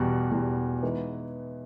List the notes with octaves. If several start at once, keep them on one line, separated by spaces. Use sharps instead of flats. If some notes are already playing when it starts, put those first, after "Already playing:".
Already playing: E2 B2 G3
E2 B2 G3
E3 G#3 B3 D#4